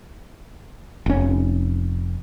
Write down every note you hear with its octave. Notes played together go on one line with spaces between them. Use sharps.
F1 C#4